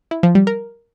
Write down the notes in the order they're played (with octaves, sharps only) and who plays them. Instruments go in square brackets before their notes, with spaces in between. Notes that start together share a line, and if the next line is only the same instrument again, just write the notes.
[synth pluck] E4
F3
G3
A#4